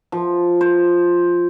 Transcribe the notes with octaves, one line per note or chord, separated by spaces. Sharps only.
F3
C5